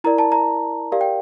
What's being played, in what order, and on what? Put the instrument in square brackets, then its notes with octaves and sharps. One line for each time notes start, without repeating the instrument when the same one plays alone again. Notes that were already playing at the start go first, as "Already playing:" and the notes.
[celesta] E4 A#4 D5 A#5
A5
A#5
G4 A#4 D5 F5
G5